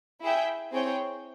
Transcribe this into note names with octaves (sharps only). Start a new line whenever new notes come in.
E4 G#4 E5 G5
C4 E4 G#4 C#5 G5